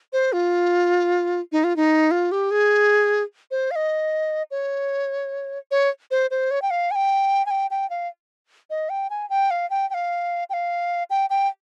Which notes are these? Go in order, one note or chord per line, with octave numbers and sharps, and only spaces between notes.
C5
F4
D#4
F4
D#4
F4
G4
G#4
C5
F5
D#5
C#5
C#5
C5
C5
C#5
G5
F5
G#5
G5
G#5
G5
G5
F5
D#5
G5
G#5
G5
F5
G5
G5
F5
G5
F5
G5
G5